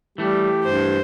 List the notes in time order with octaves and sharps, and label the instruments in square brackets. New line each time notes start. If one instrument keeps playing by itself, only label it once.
[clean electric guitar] E3 A3 [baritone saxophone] G3 [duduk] G4
[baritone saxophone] G2 [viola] C5